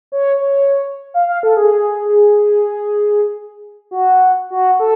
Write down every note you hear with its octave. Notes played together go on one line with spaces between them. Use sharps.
C#5
C#5
F5
F5
A4
G#4
F#4
F#4
A4